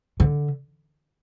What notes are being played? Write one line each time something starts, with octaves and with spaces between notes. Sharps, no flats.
D3